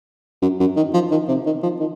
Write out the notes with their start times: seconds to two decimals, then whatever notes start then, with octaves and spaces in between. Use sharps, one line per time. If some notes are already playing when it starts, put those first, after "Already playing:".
0.42 F#2
0.60 F#2
0.76 D#3
0.94 F3
1.11 D#3
1.28 C3
1.46 D#3
1.63 F3
1.80 D#3